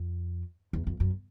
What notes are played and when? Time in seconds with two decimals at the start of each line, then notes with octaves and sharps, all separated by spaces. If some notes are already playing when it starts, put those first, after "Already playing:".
Already playing: F2
0.73 E2
0.87 F2
1.00 F#2